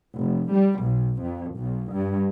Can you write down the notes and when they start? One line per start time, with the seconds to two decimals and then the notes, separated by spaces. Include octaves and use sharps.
0.16 F1
0.52 G3
0.82 B1
1.22 F2
1.58 B1
1.94 G2